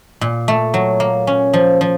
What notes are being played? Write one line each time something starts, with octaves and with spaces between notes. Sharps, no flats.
A#2
A3
F#3
A#3
C#4
F3
F3